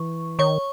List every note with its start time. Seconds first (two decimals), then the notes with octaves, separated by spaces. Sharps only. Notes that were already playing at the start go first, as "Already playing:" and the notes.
Already playing: E3 C#6
0.39 D#3 C#5 C#6